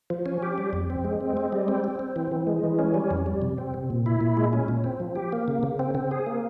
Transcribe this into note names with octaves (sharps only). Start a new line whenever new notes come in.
F3
C#4
G4
G3
F2
C4
G#3
C4
G#3
G3
C4
C4
C4
E3
E3
G#3
E3
C#4
G3
F2
G3
C3
C4
C3
A#2
E4
A#2
G#3
C#4
A#2
C4
F3
G4
A#3
C#3
C#3
C4
C4
G#4
A#3